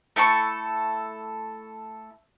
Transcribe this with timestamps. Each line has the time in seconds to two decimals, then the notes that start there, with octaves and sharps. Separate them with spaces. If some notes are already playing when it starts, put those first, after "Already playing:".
0.16 A3 E4 A4 C#6